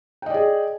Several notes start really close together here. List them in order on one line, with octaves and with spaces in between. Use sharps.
G5 D#5 D5 G#4